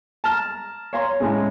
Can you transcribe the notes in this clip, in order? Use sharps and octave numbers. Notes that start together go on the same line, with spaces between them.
A5 A#5 F6
C#5 F5 A#5 C6
A2 G#3 A3 C#4